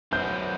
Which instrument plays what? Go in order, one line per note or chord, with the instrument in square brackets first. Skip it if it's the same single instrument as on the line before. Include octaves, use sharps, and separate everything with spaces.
[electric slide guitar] F#2 F#3 B3 F#4 C5 [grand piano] G6